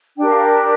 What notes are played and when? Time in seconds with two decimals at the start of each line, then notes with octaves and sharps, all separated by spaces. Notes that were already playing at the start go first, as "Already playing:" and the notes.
0.17 D4 G4 A#4 G5
0.28 F5